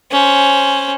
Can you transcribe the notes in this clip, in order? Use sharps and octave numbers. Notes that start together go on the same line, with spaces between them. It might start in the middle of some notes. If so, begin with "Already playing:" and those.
C#4 C5